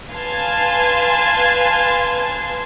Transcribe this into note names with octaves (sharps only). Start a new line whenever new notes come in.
B4 F5 G#5 A5 C6 G#6